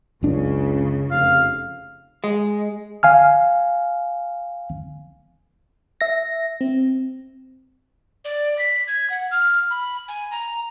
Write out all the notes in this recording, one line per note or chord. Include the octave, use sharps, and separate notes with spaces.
F#1 C#2 C#3 D4
F1 F5
G#3
F5 G#5 F6
E5 A#6
C4
D5
B6
G#6
F#5
F6
B5
G#5
A#5